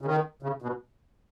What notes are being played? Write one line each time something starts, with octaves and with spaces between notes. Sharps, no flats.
C#3
D#3
C#3
B2